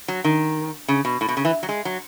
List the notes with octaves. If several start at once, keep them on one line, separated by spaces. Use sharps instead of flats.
F#3
D#3
C#3
B2
A2
B2
C#3
E3
F#3
G#3
F#3